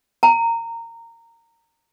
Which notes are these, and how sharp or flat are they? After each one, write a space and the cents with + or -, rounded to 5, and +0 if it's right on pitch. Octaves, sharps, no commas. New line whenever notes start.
A#5 -20